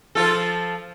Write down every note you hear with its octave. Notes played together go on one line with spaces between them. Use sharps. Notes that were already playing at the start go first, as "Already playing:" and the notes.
F3 F4 A4